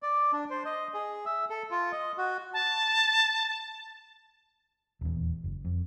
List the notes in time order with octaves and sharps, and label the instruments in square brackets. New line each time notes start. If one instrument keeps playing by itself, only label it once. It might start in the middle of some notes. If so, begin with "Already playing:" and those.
[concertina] D5
D4
C5
D#5
G#4
E5
A4
F4
D#5
F#4
[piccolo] A5
[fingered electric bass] D#1 E2
F#1
F2